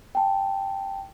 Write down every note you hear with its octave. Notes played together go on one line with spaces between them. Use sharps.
G5 A5